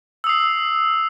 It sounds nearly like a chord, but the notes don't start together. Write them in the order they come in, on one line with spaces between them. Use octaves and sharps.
E6 D#6 C7